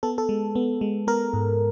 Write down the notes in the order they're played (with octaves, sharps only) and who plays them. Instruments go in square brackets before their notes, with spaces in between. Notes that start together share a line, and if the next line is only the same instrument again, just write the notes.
[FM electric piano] B3 A4
A4
G#3
B3
G#3
B3 A#4
G#2